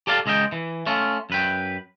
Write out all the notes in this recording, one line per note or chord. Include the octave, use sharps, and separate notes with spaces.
G4 A4 D5 F5 A5
C#2 G#3 D#5 E5 G5
E3
A3 C#4 F4
F#2 B4 G5